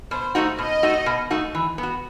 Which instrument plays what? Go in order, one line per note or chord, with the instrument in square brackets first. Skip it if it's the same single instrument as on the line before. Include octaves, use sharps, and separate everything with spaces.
[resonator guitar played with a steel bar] B2 [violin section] C5
[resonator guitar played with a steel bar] A3 D#4 F#4
[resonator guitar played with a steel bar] B2 [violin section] D#5
[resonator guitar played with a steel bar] A3 D#4 F#4
B2
A3 D#4 F#4
E3
B3
F#4